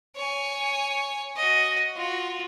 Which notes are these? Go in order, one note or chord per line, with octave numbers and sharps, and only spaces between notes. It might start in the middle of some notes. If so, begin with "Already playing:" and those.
C#5 G#5
F#4 D#5
F4 F#4